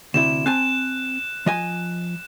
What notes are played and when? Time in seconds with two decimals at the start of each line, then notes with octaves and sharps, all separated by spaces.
0.14 D2 C3 E4 E7
0.46 C4 G#5 A5 F#6
1.46 F3 D#5 G#5